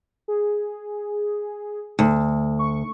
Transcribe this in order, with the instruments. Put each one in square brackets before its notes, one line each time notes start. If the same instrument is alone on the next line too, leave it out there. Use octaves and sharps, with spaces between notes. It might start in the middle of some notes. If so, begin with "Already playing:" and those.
[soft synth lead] G#4
[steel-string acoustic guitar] D2
[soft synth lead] C#6